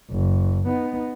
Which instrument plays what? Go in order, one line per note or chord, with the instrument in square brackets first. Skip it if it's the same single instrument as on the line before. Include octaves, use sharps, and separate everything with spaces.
[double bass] F#1
B3 D#4